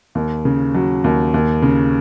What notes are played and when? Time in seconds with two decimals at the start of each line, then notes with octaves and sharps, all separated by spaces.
0.15 D#2
0.45 C#3
0.74 F#3
1.04 D#2
1.34 D#2
1.62 C#3